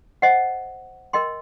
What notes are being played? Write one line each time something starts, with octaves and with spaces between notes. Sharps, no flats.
C5 D#5 F#5
A#4 D#5 G5 C6